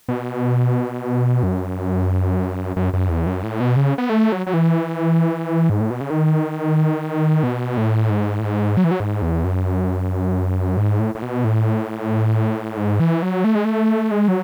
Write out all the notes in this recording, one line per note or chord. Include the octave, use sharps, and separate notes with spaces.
B2
F#2
F#2
F#2
E2
F#2
A2
B2
C#3
B3
A3
F#3
F#3
E3
G#2
A2
B2
C#3
D#3
B2
A2
G#2
A2
G#2
F#3
E3
F#3
G#2
E2
F#2
G#2
A2
A2
B2
A2
G#2
E3
F#3
A3
G#3
A3
G#3
F#3